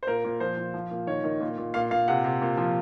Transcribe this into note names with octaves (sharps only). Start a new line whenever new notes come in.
C5
A#2 A#4
A#2
F3 C5
F3
F3
A#2
D#3 C#5
D#3
A#2
A#2
A#2 F5
A#2 F5
C3 F#5
C3
A#2
F3